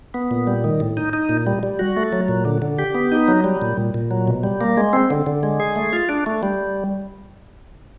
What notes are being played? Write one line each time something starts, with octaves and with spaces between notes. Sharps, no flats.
B3
A#2
G3
D#3
A2
D#4
D#4
A#2
G3
G3
F#4
A3
F#3
A#2
D3
D3
G4
B3
D#4
F#3
G3
A#2
A#2
A#2
F#3
B2
G3
A#3
G#3
C4
D3
D3
G#3
G#4
A3
F4
D4
A3
G3